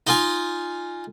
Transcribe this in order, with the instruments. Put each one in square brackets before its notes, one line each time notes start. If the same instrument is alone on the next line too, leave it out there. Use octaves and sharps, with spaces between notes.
[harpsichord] D#4 F4 G#5